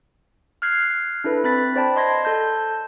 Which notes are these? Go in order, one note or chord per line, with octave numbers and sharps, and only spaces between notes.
F6 F#6 G#6 C7
D4 E4 A4 B4
C4 B5 F#6 A6 B6
C5 D5 G5 A5 B5
D#5 C6 G#6 A#6
A4 A5 G6